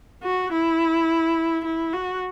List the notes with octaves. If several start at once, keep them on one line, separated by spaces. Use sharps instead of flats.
F#4
E4
E4
F#4